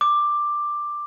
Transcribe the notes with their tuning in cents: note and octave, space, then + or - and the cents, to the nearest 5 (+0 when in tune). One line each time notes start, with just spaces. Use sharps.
D6 +10